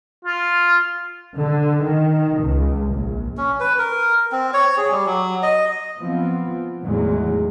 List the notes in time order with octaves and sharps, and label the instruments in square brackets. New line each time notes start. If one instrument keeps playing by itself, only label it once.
[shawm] F4
[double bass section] D3
D#3
C#2
A#1
[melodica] C#4
B4
A#4
C4
C#5
G#4
G3
F#3
D#5
[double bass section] F3 B3 C4
G#1 E2 A2 F#3 G#3